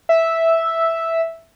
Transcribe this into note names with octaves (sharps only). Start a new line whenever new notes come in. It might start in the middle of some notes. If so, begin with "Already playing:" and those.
E5